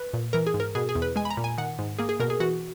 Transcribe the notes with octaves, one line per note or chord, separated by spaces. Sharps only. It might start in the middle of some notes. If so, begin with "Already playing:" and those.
Already playing: B4
A#2
E3 A#4
G#4
G#2
A#4
B2 G#4
G#4
E2
B4
G#3 G#5
B5
A#5
A#2
G#5
D#3 F#5
G#2
A#3 G#4
G#4
B2 A#4
G#4
E3 F#4